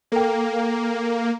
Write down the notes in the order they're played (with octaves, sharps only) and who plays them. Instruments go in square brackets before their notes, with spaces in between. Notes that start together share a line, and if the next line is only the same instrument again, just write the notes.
[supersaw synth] A#3 [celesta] A4 G5